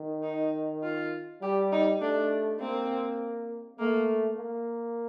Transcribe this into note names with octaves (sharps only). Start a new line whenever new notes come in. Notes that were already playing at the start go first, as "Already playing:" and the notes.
Already playing: D#3
D#4
F4
G3 G4
D#4
A3 D4
A#3 C4
A3 A#3
A#3